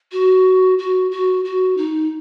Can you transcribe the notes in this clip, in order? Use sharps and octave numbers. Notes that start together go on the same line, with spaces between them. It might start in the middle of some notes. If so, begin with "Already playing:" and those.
F#4
F#4
F#4
F#4
D#4